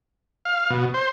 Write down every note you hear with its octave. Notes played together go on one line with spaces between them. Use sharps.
F5
B2
C5